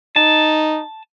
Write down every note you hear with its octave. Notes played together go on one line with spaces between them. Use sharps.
D#4 A5